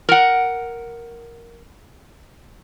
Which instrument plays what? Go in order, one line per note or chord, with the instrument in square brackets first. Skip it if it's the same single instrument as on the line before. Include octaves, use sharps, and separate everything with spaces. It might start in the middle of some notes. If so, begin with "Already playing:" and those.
[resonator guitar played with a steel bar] A#4 F#5